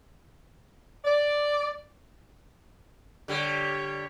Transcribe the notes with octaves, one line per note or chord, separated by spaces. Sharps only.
D5
D3 G3 G4 C#5